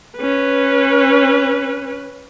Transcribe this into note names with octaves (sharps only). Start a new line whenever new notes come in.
C#4 B4